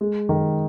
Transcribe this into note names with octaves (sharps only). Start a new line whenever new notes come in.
G#3
D#3